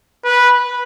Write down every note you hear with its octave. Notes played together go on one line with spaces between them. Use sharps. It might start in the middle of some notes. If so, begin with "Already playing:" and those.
B4